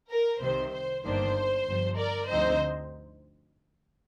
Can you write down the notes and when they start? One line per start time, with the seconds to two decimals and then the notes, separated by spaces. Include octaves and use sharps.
0.10 A#4
0.41 C2 C3 D#3 C5
0.72 C5
1.03 G1 G2 D#3 A#3 D4 C5
1.66 G1 G2 F3
1.98 A#4 D5
2.29 D2 D3 F3 C4 D#4 C5 D#5